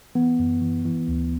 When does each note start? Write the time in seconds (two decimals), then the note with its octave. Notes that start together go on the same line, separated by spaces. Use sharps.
0.15 E3 B3
0.39 F#2
0.62 E3
0.85 E3
1.08 D2